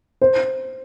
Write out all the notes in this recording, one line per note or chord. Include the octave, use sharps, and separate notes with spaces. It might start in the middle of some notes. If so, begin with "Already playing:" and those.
C5